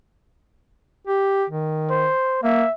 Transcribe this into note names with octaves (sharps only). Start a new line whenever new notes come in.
G4
D#3
C5
A#3 E5